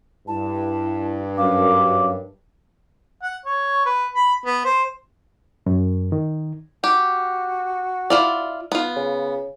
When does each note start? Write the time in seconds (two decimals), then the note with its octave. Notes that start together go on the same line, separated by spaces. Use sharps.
0.28 G2 E4 A5
1.37 F#2 F5 D6
3.22 F#5
3.45 C#5
3.85 B4
4.15 B5
4.46 B3
4.65 C5
5.66 F#2
6.12 D#3
6.84 F#4 G4
8.10 E4 F4 D5
8.72 B3 F4
8.97 C#3